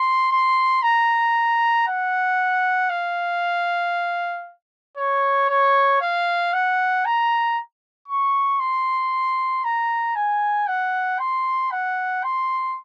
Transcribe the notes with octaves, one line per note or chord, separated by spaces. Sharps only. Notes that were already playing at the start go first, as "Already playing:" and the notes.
Already playing: C6
C6
A#5
F#5
F5
C#5
C#5
F5
F#5
A#5
C#6
C6
A#5
G#5
F#5
C6
F#5
C6